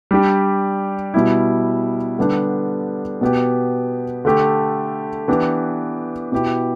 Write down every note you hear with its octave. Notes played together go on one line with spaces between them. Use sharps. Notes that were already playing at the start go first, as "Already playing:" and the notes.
G3 D4 G4
B2 G3 E4
D3 G3 B3 D4 G4
B2 B3 G4
D3 A3 G4
E3 B3 D4 G4
B2 B3 E4 G4